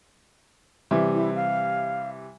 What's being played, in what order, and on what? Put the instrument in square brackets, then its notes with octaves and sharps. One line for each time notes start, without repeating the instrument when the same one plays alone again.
[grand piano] C3 E3 G3
[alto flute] E4
F5